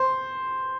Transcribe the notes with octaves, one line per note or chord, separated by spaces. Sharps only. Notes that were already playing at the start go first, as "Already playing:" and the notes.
Already playing: C5